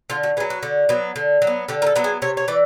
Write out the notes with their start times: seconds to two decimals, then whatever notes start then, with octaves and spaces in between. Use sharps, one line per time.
0.10 D3 F4
0.23 F#4
0.37 B3 G#4
0.40 F#3
0.50 F#4
0.63 D3
0.89 F#3 B3
1.16 D3
1.42 F#3
1.47 B3
1.69 D3 G4
1.82 A#4
1.87 A4
1.96 F#3 B3
2.04 G#4
2.22 C3 C#5
2.37 C#5
2.48 E3 D5